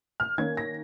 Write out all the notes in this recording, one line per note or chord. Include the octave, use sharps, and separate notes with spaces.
F6
D#3 A#3 C#4 G#6
A#6